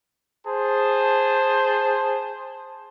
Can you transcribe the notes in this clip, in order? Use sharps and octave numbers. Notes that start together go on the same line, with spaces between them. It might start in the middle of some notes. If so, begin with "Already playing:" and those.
G#4 C5 A5